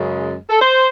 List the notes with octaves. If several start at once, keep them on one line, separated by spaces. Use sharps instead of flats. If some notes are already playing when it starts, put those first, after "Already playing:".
Already playing: F#2 C#3 G#3
A4
C5